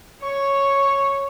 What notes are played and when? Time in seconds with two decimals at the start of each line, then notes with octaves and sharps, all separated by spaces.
0.23 C#5 C#6